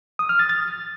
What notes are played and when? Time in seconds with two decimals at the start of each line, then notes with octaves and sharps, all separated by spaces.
0.19 D#6
0.29 F6
0.39 A6
0.49 A6